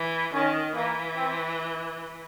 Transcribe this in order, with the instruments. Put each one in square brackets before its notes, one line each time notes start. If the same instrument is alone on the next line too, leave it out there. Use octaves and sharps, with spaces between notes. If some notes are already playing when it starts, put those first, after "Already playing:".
Already playing: [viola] E3
[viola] D#3 [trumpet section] C#4
[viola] E3 [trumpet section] A#3
[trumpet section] C4